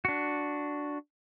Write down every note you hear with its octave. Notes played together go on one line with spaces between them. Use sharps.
D4 F#4